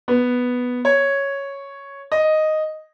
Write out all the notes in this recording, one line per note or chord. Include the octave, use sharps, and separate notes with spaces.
B3
C#5
D#5